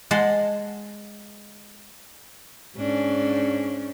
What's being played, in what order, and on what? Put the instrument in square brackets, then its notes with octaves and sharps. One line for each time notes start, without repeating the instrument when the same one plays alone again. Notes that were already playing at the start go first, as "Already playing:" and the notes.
[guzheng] G#3 F#5 A5 C6
[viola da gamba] G#2 C#4 D4